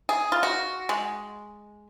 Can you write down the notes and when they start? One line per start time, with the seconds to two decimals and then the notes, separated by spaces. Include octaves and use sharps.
0.09 G#4
0.32 F4
0.43 F#4
0.89 G#3